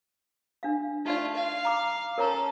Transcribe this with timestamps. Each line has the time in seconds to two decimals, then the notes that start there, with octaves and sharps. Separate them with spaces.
0.63 D4 F5
1.05 A3 D#4 F4 D5
1.35 F5
1.65 A#5 D6
2.18 C#4 A4 A#4 C#5 A#5